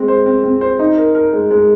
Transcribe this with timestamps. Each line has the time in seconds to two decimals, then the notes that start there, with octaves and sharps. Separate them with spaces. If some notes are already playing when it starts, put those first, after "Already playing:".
Already playing: G#3 C4
0.08 C5
0.26 C4
0.43 C4
0.61 C5
0.79 D#4
0.97 A#4
1.15 A#4
1.33 G#3
1.51 G#3